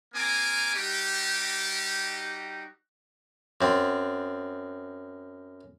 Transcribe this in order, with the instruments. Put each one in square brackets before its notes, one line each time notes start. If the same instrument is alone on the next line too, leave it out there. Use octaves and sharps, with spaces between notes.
[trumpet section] A#3 C4 F4 G#5 A#5 D6
G3 D#4 F#4 G4
[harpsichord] F#2 C4